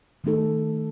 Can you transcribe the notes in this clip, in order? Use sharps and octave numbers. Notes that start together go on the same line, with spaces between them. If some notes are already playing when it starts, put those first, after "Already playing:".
D#3 A3 D#4 A4